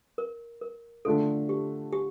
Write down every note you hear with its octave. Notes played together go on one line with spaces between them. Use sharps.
A#4
A#4
D3 A3 D4 F4 A4
G4
G4